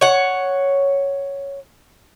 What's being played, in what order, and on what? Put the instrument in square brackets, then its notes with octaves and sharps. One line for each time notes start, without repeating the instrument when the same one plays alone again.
[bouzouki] C#5 F#5